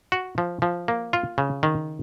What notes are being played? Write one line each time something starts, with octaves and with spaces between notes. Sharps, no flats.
F#4
F3
F3
A#3
F4
C#3
D#3